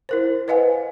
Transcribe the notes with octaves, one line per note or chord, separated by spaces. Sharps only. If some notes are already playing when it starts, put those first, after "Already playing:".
E4 A#4 C5
B4 C5 D#5 F5 F#5 G#5